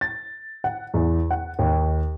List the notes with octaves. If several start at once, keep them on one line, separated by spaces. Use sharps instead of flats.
A6
F#5
E2
F#5
D#2